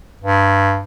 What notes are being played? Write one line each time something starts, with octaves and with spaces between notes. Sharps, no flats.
G2